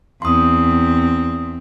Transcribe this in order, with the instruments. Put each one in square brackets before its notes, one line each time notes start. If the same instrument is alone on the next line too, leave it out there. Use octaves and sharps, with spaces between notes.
[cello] E2 C4 [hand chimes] C6 D#6